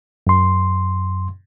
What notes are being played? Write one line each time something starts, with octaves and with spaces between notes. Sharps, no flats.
F#2 C6